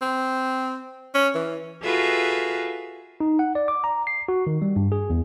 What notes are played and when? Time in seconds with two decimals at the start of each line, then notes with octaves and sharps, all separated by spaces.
0.01 C4
1.14 C#4
1.35 E3
1.83 F4 F#4 G#4 A4 B4 E5
3.20 D#4
3.39 F#5
3.55 D5
3.68 D6
3.84 A#5
4.07 C7
4.29 F#4
4.47 D#3
4.62 G3
4.76 G2
4.92 G#4
5.10 E2